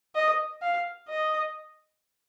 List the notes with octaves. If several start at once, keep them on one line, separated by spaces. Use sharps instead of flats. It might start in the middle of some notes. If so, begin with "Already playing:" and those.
D#5
F5
D#5